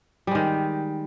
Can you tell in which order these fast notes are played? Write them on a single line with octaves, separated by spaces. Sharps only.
G3 G#3 D#3